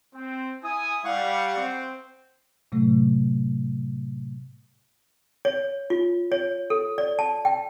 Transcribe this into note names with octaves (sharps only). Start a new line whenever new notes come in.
C4
E4 G#5 D#6
G3 F5 F#5 C#6
C4
A2 C3 F#3 A3
C#5
F4
C#5
A4
D5
A5
G5